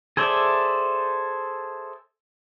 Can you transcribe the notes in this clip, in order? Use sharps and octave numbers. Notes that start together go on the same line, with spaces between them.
G#4 A4 C5 D5 E5